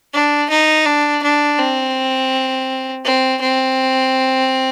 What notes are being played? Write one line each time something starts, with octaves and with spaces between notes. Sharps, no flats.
D4
D#4
D4
D4
C4
C4
C4